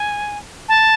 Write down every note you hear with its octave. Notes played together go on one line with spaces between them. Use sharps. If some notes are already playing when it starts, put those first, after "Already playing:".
Already playing: G#5
A5